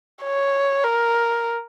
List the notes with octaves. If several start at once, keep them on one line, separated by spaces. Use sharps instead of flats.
C#5
A#4